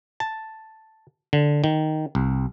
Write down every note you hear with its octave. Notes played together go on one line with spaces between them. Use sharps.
A5
D3
D#3
C2